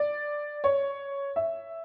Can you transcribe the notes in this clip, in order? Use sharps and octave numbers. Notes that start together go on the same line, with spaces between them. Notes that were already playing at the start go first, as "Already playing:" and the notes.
Already playing: D5
C#5
E5